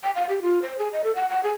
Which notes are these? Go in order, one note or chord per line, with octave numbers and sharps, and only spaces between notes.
G5
F5
G4
F4
C5
G#4
D#5
A4
F#5
F#5
G#4